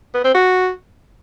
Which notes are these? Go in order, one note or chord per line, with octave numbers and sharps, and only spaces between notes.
B3
C4
F#4